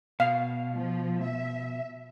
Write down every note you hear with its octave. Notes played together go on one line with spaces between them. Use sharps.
B2 F5
F3
E5